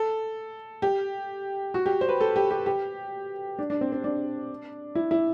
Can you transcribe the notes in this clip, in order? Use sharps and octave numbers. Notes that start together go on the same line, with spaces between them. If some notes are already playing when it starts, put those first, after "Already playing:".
Already playing: A4
G4
F#4
G4
C5
B4
A4
G4
G4
G4
D4
D4
C4
C4
D4
E4
E4